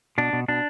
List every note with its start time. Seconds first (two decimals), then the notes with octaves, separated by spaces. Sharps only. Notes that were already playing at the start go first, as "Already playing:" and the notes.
0.18 B2 D4
0.33 B2
0.48 B2 D4